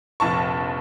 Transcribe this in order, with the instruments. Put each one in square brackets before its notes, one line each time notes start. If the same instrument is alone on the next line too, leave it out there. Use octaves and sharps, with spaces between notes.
[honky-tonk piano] F1 A#1 A5 C#6